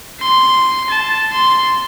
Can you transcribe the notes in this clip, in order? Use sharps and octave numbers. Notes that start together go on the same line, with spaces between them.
C6
A5
C6